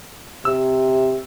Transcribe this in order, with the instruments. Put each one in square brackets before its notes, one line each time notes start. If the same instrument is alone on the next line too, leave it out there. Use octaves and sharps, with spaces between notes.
[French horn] C3 [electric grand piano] E6